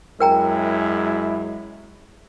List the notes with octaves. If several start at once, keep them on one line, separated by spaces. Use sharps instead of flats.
F#2 G#3 E4 A#4 G5 A#5